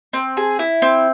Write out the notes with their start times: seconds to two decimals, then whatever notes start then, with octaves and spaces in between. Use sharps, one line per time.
0.13 C4
0.37 G#4
0.59 E4
0.82 C4